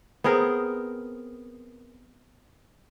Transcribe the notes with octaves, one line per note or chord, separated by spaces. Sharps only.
B3 C4 G#4 A#4